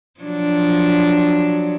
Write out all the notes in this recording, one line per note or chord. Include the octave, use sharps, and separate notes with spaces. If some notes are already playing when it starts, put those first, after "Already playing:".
F3 F#3 D4